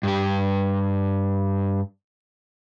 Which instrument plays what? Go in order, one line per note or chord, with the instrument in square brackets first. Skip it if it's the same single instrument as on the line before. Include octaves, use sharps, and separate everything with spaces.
[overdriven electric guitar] G2 G4